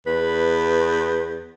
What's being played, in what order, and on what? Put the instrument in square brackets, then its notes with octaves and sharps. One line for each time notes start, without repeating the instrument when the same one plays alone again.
[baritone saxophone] E2 [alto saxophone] B4